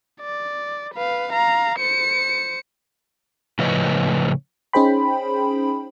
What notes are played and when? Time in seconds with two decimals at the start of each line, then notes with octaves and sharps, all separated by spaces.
0.21 D5
0.94 B4 F5
1.32 F5 A#5
1.79 C5 C#7
3.59 A2 C#3 F3 B4 C#5 D#5
4.73 C#4 D#4 G#4 C5 G5 B5